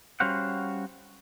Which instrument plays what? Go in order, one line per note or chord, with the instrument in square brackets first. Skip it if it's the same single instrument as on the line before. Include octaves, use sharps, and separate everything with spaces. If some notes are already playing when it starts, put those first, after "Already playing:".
[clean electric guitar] G3 C#4 F#4 C5 F5 F#5